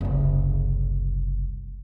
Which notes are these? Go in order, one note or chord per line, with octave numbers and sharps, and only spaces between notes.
F#1 C2